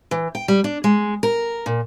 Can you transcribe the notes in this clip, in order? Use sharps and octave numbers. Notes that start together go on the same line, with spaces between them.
E3
G5
G3
D4
G#3
A#4
A#2